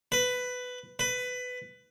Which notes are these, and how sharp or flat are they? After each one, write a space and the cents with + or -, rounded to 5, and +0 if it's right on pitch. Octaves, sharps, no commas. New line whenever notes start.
B4 +10
B4 +15